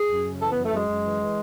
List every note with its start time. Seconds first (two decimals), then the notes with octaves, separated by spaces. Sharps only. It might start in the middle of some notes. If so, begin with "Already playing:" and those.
Already playing: G#4
0.09 F#2
0.25 C#3
0.40 E3 A4
0.52 F#2 B3
0.65 A3
0.72 F#2 G#3
0.88 F#2
1.04 E3
1.19 E3